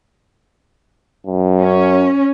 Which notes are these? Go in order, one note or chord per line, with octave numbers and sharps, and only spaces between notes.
F#2
C#4